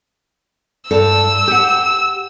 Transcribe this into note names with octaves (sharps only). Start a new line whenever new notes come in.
G2 A4 A5 E6
G4 F#5